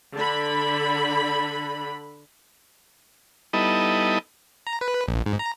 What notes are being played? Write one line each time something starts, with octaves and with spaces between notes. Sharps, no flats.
D3 B5
G3 B3 D#4 E4 A4 D#5
A#5
B4
A#1
G#2
A#5